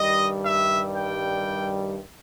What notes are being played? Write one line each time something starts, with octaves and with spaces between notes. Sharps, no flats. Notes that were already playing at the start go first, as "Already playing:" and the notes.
Already playing: G2 D#3 G3 D#5
E5
G5